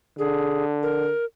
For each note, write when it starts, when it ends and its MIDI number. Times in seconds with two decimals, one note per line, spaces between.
0.18 1.11 50
0.18 0.64 68
0.83 1.25 70